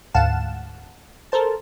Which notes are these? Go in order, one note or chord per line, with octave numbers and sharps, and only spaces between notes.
D2 G#2 F5 F#5 A5 E7
A4 A#4 C5 A5